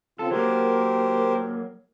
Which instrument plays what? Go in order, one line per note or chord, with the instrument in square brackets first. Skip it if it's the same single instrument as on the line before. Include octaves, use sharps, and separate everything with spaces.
[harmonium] C#3 C4 F4 [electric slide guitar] A4
[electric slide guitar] F#3 A#3 [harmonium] G4 A#4 C5